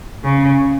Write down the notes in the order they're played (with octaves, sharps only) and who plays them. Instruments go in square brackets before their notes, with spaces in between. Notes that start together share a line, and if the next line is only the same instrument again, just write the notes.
[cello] C#3